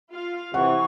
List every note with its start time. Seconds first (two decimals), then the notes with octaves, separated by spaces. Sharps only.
0.12 F4 F5
0.54 C3 E3 F#5 C#6